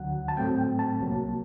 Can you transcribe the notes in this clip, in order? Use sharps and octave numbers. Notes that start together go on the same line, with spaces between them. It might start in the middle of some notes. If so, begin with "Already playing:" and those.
Already playing: D2 D3 F#3 F#5
A5
A2 F#3 A3 C4 G5
G5
A5
C2 C3 F#3 A#3